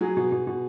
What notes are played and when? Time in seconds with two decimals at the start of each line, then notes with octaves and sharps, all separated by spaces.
0.01 F#3 G#4
0.17 B2
0.32 B2
0.47 B2